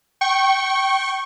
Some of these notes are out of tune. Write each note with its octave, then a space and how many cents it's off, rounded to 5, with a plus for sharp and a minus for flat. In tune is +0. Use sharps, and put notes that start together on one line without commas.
G5 -20 C#6 -20